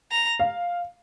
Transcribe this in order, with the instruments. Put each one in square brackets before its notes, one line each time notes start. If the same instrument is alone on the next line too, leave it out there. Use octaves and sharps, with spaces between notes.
[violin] A#5
[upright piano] F5